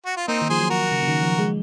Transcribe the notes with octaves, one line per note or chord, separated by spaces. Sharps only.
F#4
F4
A#3 C4 D#4
D#3
F3 G#4 C5
F#3
F#4 A#4
C#3
C#3
D#3
F3
G#3